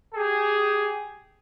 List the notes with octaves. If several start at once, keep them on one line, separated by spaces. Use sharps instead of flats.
G4 G#4